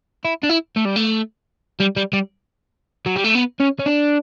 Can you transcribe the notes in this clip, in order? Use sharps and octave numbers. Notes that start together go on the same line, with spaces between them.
E4
D4
E4
A3
G3
A3
G3
G3
G3
F#3
G3
A3
B3
C#4
C#4
D4